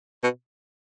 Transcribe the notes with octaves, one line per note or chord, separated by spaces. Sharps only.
B2